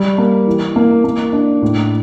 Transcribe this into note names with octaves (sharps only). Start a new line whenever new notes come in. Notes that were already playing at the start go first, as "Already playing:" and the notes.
Already playing: G3
A#3
E3
A#3
A#3
D4
A2